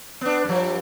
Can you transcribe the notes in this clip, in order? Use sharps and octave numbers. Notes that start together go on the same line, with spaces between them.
B3 D4
G2 F3